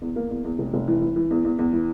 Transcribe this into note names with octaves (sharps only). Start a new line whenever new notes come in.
E2
A#3
E2
E2
F1
F1
E3
E3
E3
E2
E2
E2
E3